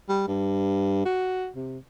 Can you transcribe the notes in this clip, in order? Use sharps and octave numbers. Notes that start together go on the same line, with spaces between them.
G3
G2
F#4
C3